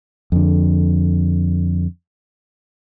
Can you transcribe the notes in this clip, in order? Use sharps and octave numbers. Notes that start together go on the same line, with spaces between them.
F2 D3